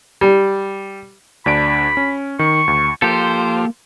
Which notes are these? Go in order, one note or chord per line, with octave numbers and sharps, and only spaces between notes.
G3
D2 D4 B5 D7
C#4
D#3 C#6
D2
F3 A#3 F4 G4 A4 C5 D6